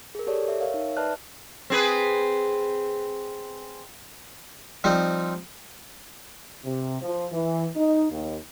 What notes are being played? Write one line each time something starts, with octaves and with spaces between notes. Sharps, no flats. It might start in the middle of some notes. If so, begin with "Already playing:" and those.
G#4 A#4
G4 A4 C#5 D5
E5
A#4 C#5 E5 F5
D#4
B4 D5 E5 A5 F6 F#6
C4 G#4 B4
F3 G3 C4 D#4
C3
F3
E3
D#4
D#2